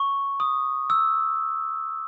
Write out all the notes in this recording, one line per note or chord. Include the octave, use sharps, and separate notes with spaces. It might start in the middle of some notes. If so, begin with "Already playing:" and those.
Already playing: C#6
D#6
E6